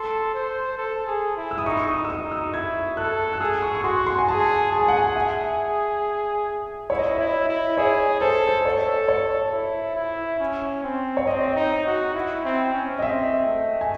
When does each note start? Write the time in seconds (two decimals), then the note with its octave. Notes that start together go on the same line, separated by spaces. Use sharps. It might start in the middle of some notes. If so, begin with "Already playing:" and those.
Already playing: A4 C6
0.34 C5
0.78 A4
1.07 G#4
1.37 E4
1.51 E6
1.58 D#6
1.66 D#4 C#6
1.77 C#6
1.88 D#6
1.95 D#4
2.05 E6
2.10 D#6
2.24 D#4
2.32 E6
2.53 E4 G#6
2.97 A4 F#6
3.33 F#6
3.40 G#4 E6
3.62 C#6
3.75 C#6
3.84 F#4 C6
4.07 C6
4.18 G#5
4.28 G#4 A5
4.72 G#4 A5
4.80 G#5
4.88 F#5
4.97 G#5
5.16 E5
6.90 E4 C#5
6.99 D#5
7.08 C#5
7.19 E4
7.49 E4
7.77 G#4 C#5
8.21 A4 C5
8.47 C5
8.65 A4 C#5
9.08 C#5
9.53 E4
9.96 E4
10.40 C#4
10.84 C4
11.17 C#5
11.27 C4 D#5
11.56 D#4
11.87 F#4
12.15 E4
12.45 C4
12.74 C#4
12.99 D#5
13.02 C4 E5
13.46 A3
13.81 G#5